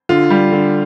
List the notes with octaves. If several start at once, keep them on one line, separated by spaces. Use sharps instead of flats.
D3 F4
G3
D3